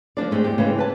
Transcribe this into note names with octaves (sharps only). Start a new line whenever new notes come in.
F3 A#3 D4 D5
G#3 A3 C4 D4 G4
E2 G4
C#3 E3 G#3 A#3
B4 A5